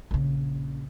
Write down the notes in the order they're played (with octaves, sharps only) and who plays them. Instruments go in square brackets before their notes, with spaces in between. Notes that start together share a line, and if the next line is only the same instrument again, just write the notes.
[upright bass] A#1 C#3